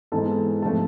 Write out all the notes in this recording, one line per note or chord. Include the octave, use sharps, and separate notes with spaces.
G#2 E3 G#3 B3 A4 A5
C3 F3 A3 A4 A5